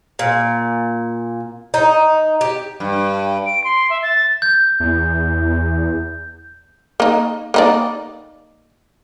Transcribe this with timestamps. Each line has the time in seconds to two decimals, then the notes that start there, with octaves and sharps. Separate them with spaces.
0.19 A#2
1.74 D#4
2.41 G4
2.80 G2
3.46 D7
3.64 C6
3.90 E5
4.03 A6
4.42 G6
4.80 E2
7.00 A#3 D#4
7.54 A#3 D#4 D5